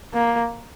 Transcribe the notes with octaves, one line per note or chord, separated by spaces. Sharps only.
A#3